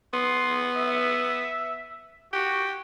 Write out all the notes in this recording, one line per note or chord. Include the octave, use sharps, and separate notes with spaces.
B3 C6
E5
F#4 G4